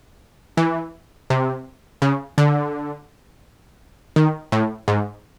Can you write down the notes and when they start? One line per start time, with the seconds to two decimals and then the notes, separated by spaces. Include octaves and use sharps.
0.57 E3
1.30 C3
2.02 C#3
2.38 D3
4.16 D#3
4.52 A2
4.88 G#2